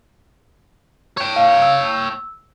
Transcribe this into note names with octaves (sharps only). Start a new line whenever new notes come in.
C#5 G5
F5
E6